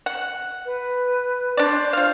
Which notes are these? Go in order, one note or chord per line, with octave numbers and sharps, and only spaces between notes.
F#5
B4
D4 C5 D5
F4 F5